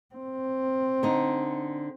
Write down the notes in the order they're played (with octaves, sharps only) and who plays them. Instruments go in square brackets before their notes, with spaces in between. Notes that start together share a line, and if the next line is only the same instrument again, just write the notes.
[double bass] C4
[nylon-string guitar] D3 D#4